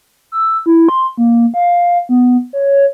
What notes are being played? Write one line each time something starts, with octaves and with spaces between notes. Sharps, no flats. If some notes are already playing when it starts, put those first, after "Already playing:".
E6
E4
C6
A#3
F5
B3
C#5